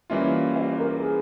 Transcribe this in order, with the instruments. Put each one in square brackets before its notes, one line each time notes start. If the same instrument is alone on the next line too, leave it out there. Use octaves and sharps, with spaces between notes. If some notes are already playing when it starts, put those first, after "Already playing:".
[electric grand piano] E3 G3 A#3 C#4 F4 [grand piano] E5
[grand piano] C5
A#4
G#4